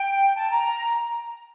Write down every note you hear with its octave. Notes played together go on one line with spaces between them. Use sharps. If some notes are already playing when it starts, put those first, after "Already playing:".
Already playing: G5
A5
A#5